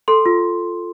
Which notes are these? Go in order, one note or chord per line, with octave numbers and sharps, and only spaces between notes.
A4 C6
F4